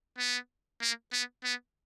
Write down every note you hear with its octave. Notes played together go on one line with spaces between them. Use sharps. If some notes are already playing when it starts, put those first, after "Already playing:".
B3
A#3
B3
B3